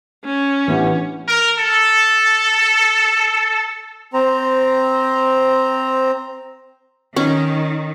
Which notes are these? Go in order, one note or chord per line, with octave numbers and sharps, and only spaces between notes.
C#4
A1 E3 B3 D4 G4 F#5
A#4
A4
C4 C5 A#5
D#3 C#4